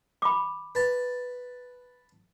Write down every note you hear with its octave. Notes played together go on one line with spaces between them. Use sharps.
B5 D6
B4 A5